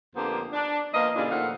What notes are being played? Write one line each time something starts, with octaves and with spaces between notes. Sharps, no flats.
F2 D3 A#3 B3 G4 C5
D4
F3 A#3 B3 D#5
A#2 C#3 G3 D4 E4 F4
A#2 D#3 F3 A3 F5 F#5